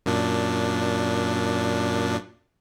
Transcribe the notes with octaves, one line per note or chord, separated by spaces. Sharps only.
F#2 A#2 D4